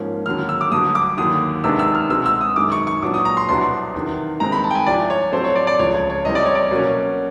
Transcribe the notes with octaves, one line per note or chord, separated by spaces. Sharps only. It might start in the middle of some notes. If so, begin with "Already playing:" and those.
Already playing: G#2 F3 A#3 C#4
D#2 D3 F#3 F6
E6
D6
G2 D3 F#3 A3 D#6
D6
D#2 D3 F#3 D#6
C3 D#3 G#3 B3 D4 E6
E6
F6
B2 G#3 C4 E6
E6
D#6
F#2 D#3 G#3 D6
C#6
C#6
A#2 F#3 B3 D4 D6
D#6
A#5
C6
C2 B2 F#3 B3 D4 C6
E2 C3 D#3
G2 D#3 G#3 C4 A#5
B5
A5
G5
G#5
C2 C3 F3 D5
C#5
A2 F#3 A3 C4 C5
C#5
D5
D5
C#2 C#3 F3 C#5
C#5
C#5
C3 E3 G3 C4 D#5
D5
C#5
D5
B2 F#3 A#3 C#4